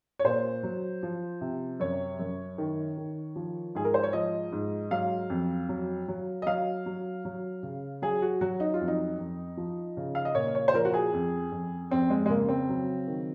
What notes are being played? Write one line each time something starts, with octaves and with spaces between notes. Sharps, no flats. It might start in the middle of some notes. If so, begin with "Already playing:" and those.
C#5
A#2 C5
F#3
F3
C3
F#2 C#5
F#2
D#3
D#3
F3
G#2 G#4
A#4
C5
C#5
F3 D#5
G#2
F#3 F5
F2
F#3
F#3
D#5
F#3 F5
F#3
F#3
C#3
F#3 G#4
F#4
F#3 F#4
D#4
F4
F2
D#4
F2
F3
C#3
F5
D#5
A#2 C#5
C#5
C5
F3 A#4
F#4
G#4
F2
F2
F2 C4
G#3
G#3
C#3 A#3
C4
F#3
D#3